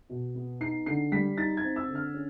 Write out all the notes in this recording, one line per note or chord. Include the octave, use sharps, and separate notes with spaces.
B2
B3
D#4 C7
D3 C7
G3 B6
D#4 A6
G#6
C4
E6
D3
F6
C#4